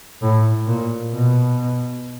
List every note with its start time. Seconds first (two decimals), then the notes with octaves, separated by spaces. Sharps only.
0.22 A2
0.67 A#2
1.12 B2